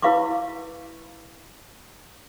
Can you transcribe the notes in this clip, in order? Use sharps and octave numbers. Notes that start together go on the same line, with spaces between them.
E4 B4 F5 B5 C#6 D6